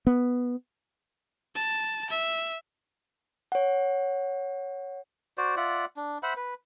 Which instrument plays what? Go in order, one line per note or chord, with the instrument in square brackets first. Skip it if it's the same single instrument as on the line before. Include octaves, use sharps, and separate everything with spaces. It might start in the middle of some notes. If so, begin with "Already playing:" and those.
[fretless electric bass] B3
[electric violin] A5
E5
[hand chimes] C#5 F#5
[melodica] F#4 C5 D5
F4 D5 E5 F#5
D4
C5 E5 F#5 B5
B4